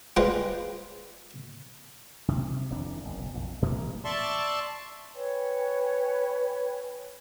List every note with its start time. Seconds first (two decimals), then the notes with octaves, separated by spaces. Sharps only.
0.17 G3 G#3 F4 B4 C5
2.28 C3
2.70 D#1 F2 E3 D4
3.05 F#1 B1
3.34 A#1 F2
3.62 A2 E3 A#3 B3
4.05 D5 E5 A5 C6 C#6
5.14 B4 C#5 G5 G#5